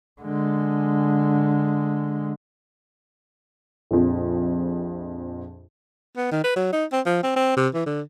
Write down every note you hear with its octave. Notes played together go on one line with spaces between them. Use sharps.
D3 G#3
A#1 F2
B3
D#3
B4
F#3
D#4
C4
F3
C4
C4
C3
E3
D3